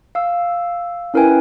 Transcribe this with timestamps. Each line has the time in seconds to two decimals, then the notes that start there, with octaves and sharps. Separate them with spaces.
0.15 F5 E6
1.14 C#4 E4 A#4 B4 G5 G#5